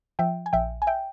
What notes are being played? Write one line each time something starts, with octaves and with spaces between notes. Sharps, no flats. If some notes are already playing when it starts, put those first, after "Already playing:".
F3 E5 G5
G#5
A#1 E5 G5
G#5
E5 G5